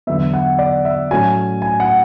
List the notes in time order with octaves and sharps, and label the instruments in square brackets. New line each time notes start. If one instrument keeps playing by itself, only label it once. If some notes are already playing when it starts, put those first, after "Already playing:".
[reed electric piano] E2 D3 F#3 B3 [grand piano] E5
[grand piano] F#5
D5
E5
[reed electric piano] A2 F#3 A3 C#4 F#4 [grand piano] G#5
[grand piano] G#5
F#5